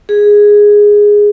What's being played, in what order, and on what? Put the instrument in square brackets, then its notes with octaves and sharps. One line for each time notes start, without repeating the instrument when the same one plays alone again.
[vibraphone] G#4